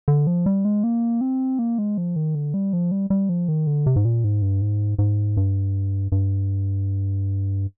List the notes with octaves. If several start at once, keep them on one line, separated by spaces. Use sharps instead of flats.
D3
F3
G3
G#3
A#3
C4
A#3
G#3
F3
D#3
D3
G3
F3
G3
G3
F3
D#3
D3
C3
G#2
A#2
G#2
G2
G#2
G#2
G2
G2